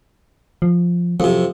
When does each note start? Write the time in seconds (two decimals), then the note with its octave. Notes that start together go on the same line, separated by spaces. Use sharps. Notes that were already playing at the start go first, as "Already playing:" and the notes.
0.62 F3
1.20 F2 C3 F#3